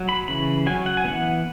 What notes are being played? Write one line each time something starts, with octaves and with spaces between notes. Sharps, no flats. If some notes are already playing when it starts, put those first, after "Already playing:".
Already playing: F#3
B5
C#3 E3 C#4 B5
F#3 C#4 G#5
F#5
G#5
E3 B3 F#5